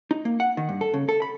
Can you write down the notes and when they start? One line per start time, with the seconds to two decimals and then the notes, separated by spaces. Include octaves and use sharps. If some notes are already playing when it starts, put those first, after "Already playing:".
0.11 D#4
0.25 A#3
0.40 F#5
0.57 D#3
0.69 G2
0.81 A4
0.94 C#3
1.09 A4
1.22 B5